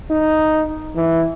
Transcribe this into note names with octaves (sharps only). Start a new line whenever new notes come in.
D#4
E3